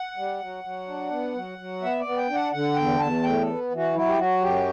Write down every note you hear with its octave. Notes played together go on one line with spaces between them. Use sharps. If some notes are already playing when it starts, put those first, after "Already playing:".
Already playing: F#5
G3
F#3
F#3
D4
B3
F#3
F#3
B3 E5
D5
B3
G5
D4
F#5
D3 F#5
E2 G5
E2 A5
A2 G5
A4
B3
E3
F#4
F#3 E4
G4
F#3 F#4
F#2 G4